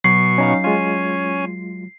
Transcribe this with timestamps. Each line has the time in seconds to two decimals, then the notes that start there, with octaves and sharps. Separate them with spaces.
0.04 B2 F#3 C#6 C7
0.38 C#4 D#4 F5
0.64 G#3 C#4 F4 G#5